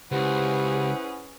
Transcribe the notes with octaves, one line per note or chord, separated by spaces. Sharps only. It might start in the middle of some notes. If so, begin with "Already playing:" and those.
C#2 C#4 E4 G4 G#4 B4 C5 F#5